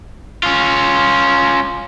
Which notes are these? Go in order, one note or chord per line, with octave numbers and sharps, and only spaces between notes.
C#4 F4